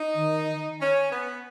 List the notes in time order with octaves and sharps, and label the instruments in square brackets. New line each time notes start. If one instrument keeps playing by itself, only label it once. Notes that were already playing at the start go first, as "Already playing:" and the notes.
Already playing: [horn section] D#4
[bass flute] D#3
[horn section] C#4
B3